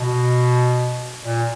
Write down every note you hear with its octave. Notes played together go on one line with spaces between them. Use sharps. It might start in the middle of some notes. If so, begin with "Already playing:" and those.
Already playing: B2
A#2